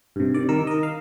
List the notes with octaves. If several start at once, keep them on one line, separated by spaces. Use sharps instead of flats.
G2 C3
D#3 D5
D#3 A#4 E6
A#4 D#5
F5